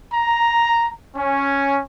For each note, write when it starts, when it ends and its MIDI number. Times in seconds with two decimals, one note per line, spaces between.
0.12 0.89 82
1.15 1.79 61